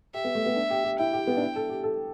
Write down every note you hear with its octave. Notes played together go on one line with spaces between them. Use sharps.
G4 E5
B3
A3
B3
D4
G4
G4
E4 G5
G4
B3
D4
E4
A4
G4
A4